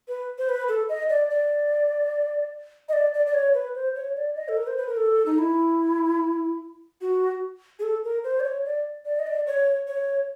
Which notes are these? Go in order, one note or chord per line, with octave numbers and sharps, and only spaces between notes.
B4
C5
B4
A4
D#5
D5
D5
D#5
D5
D5
D5
C#5
B4
C5
C#5
D5
D#5
A4
A#4
C5
B4
A#4
A4
D#4
E4
F#4
G#4
A4
A#4
C5
D5
C#5
D5
D5
D#5
D5
C#5
C#5